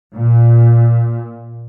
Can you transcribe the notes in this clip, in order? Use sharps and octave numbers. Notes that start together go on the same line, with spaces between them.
A#2